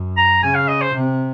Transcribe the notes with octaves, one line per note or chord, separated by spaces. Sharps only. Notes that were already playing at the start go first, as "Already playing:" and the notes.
Already playing: F#2
A#5
C#3 G#5
F5
D#5
C5
C3